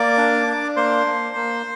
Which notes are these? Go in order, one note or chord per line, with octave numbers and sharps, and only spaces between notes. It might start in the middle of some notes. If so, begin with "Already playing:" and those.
Already playing: A#3 D5 D6
D4
D4
A#3 C5 C6
A#3
A#3